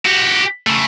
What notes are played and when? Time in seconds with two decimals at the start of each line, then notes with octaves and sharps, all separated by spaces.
0.05 F#4 G4
0.67 C#3 A3